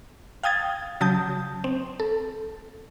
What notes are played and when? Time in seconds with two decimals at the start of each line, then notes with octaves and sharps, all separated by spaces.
0.43 F5 G5 D#6 G#6 A6
1.01 C#3 F#3 A5 D#6 G6
1.64 C4
2.00 A4